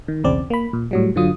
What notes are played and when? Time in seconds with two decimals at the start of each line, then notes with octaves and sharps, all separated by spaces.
0.08 D#3
0.24 B1 E2 C#3 C4 D5
0.50 A#3 B5
0.73 A#2
0.91 A2 F#3 G3
1.15 G1 D3 F#3 F4 D#6